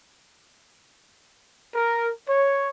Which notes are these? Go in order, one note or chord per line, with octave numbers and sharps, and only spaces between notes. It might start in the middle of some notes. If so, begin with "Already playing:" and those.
A#4
C#5